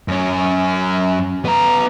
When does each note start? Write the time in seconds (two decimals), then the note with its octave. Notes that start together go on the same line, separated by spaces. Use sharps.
0.08 F#2 C#4
1.45 B3 A#5